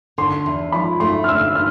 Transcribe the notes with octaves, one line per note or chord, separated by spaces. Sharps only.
D3 C6
E2
F3 B5
A3 C6
F6
D3 E6
F6